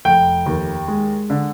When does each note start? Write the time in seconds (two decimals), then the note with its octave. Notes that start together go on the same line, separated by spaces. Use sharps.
0.05 F1 G5
0.46 D#2
0.88 G#3
1.30 D3